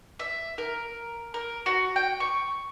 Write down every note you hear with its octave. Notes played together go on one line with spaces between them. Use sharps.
E5
A#4
A#4
F#4
G5
C#6